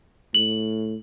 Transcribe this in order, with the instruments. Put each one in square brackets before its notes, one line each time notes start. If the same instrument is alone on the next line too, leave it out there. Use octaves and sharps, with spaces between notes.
[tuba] A2 [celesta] F#7